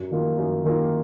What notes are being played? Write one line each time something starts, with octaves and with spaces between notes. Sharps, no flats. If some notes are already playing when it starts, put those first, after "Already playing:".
Already playing: F#2
D#3 A#3 F4
F#2
D#3 A#3 F4